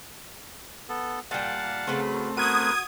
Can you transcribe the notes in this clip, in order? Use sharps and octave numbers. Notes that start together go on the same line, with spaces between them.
B3 A4
A#2 G3 F5 F#5 A5
C#3 F#3 A3 B3 C4
B3 F#4 A#4 B4 D#6 G#6 D#7